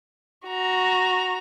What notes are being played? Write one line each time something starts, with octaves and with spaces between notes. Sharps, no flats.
F#4 A#5